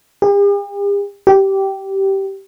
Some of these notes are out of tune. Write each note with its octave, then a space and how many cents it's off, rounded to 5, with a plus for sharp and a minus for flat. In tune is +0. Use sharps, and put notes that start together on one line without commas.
G4 +45
G4 -15